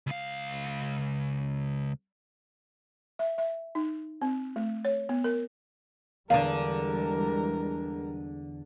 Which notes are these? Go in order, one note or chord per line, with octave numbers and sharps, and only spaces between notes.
C#2 F5
E5
E5
D#4
C4
A3
C#5
B3
A#4
E2 D3 E3 G3 G#3 A#4 F5